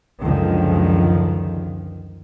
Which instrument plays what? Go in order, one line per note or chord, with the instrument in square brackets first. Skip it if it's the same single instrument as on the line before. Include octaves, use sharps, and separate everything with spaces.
[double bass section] C#2 F#2 D3 D#3 F3 G#3